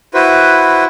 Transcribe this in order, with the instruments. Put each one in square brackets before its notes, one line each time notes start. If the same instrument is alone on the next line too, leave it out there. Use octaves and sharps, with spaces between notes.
[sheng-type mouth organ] E4 F#4 B4 C5